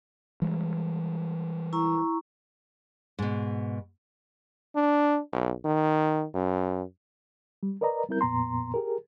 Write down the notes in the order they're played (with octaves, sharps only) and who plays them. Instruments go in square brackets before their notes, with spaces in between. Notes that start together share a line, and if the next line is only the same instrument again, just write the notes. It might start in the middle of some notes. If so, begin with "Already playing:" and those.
[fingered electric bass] E3 G3 G#3
[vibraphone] E4 A#5 C#6
[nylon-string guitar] G#2 B2
[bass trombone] D4
B1
D#3
F#2
[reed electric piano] G3
A#4 B4 D5 D#5 A#5
G3 C4 E4 A#4 G6
F2 A#2 B3 A#5 C6
G4 G#4 A#4